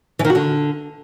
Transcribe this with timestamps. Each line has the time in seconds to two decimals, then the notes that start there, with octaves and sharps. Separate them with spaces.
0.19 E3
0.25 D#3
0.30 F#4
0.35 D3